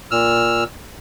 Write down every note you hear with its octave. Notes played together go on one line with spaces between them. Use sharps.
A#2 E6 F6